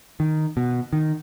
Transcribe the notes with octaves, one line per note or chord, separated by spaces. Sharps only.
D#3
B2
D#3